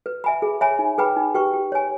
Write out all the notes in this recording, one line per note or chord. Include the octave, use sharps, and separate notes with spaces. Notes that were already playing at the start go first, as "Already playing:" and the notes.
B4
E5 G#5 B5
G#4
C#5 E5 G#5 B5
D#4
G#4 B4 G5 B5
D#4
G4 B4 G5 C#6
G4
C#5 G#5